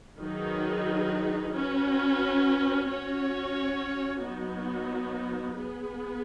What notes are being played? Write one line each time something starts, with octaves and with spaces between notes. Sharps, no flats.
D#3 F#3 D#4 G#4 B4
C#4 F#4 B4
C#4 F#4 C#5
F#3 B3 D#4 F#4
B3 G#4 B4